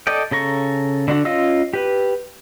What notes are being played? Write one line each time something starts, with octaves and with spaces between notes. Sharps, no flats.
A4 D5 D#5 G5
C#3 A4 A#5 C#6
D3 D4 F#4
C#4 F4 D#5 F5 E6
G4 B4